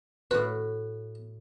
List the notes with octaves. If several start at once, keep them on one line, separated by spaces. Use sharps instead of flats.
A2 F#4 B4